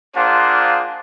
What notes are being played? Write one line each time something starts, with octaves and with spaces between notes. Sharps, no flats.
A#3 D4 F4 G#4 C5 F#5